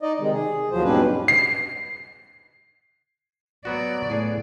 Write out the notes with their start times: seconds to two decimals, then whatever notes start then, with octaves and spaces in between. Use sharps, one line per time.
0.01 D#4 D5 D#5
0.20 C3 D#3 G#3
0.32 G#4
0.71 D#2 F3 F#3 C5
0.84 G#2 B2 G3 C#4 D4 B4
1.28 C7
3.65 F#3 B3 F#4 D5
4.09 A2 B3 D4 G#4